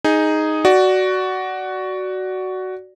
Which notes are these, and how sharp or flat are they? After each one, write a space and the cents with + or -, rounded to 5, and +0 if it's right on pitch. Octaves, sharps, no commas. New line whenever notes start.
D#4 +0 G#4 +0
F#4 +10 D5 +0